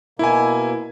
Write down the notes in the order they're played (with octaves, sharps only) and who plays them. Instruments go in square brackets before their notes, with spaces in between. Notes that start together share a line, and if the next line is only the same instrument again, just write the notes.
[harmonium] B2 A#3 [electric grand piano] E4 G#5